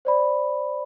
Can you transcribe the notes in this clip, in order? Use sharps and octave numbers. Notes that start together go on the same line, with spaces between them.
C5 D5 B5